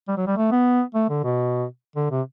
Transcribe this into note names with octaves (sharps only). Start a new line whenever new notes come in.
G3
F#3
G3
A3
B3
A3
D3
B2
D3
C3